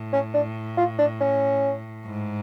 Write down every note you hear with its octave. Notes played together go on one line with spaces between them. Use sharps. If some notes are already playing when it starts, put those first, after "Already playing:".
Already playing: A2
C#4
D4
F4
D4
C#4
G#2